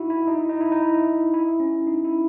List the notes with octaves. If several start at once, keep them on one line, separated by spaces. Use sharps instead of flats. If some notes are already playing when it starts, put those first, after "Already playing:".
Already playing: D#4 E4 F#4
E4
D#4
E4
D#4
E4
D#4
E4
D#4
E4
C#4
D#4
E4